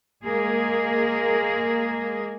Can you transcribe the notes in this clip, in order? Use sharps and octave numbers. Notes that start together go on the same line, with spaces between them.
G#3 A#3 G#4